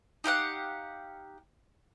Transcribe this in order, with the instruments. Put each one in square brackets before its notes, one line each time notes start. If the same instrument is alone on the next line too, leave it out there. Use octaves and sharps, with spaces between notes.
[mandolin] D#4 G4 F5 F#5